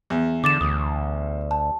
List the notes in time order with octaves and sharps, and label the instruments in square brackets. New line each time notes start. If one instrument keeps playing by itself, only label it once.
[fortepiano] E2
[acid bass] D3 [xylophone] D6 A6 E7
[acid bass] D2 [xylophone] D#6
[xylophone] A5